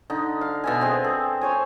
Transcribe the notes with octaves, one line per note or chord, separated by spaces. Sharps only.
D3 D#4
F5
B2 E5 G#5
C4 G#4
A4
C5 C#5 G#5